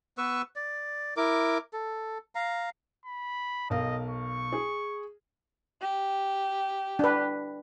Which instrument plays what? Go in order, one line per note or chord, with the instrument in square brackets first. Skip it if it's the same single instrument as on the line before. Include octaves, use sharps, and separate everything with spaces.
[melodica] B3 B4 C#6 E6
D5
E4 A#4 D6
A4
F5 A#5
[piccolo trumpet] B5
[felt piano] B1 A#4 F5 [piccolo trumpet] D#5
[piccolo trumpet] C#6
[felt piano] G#4
[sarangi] G4
[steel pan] D4 B4